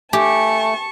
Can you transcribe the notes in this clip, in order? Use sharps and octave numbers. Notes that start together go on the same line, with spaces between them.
A3 G4 G#5 A5 C#6